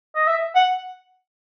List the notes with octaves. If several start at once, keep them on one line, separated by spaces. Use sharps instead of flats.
D#5
E5
F#5